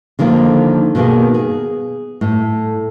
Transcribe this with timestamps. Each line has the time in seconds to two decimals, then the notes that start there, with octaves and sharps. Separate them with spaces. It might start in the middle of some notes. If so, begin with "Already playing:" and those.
0.19 D3 D#3 F3 A#3
0.95 B2 D#3 A#3 G#4
1.34 G#4
2.21 A2